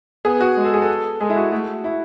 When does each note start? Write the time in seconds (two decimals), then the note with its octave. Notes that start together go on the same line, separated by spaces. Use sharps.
0.25 B3 G#4
0.41 F#4
0.57 G#3
0.64 A4
0.74 G#4
0.82 A4
1.20 G#3 G#4
1.30 E4
1.36 F#4
1.51 A3 F#4
1.84 E4